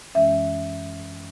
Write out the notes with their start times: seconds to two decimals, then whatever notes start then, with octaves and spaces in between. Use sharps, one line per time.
0.15 F#2 E3 G#3 C#4 E5